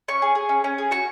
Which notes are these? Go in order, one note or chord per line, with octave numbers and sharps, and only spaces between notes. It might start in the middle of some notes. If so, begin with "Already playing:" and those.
C#4 C#6
G#4
G#4
C#4
C#4
G#4
F#4 C#6